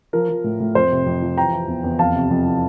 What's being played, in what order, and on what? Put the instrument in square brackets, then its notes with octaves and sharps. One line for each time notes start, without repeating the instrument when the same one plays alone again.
[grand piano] F3 A#4
F3
A2
A2
F2 C5
C3
F2
F3
E3 G5 A#5
E3
E2
E2
F2 F5 A5
C3
F2
E3